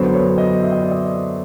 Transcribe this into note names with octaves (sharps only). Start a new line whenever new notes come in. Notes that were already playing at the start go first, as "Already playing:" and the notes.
Already playing: F#2 D3 F#3 B3 C5
C#5
D#5
E5
D#5
D5
D#5